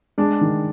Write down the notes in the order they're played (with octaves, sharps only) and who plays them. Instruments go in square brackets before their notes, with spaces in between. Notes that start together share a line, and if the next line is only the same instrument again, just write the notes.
[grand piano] G#3 D4
D#3